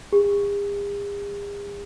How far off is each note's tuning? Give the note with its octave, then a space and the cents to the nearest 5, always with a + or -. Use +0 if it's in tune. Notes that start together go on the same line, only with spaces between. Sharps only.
G#4 -45